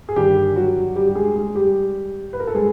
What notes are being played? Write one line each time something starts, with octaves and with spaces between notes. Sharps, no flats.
G#4
G1 G2 D#3 G3 G4
F#3 F#4
G3 G4
G4
G#3 G#4
G#3 G#4
G3 G4
B4
A#4
A4
G#3 G#4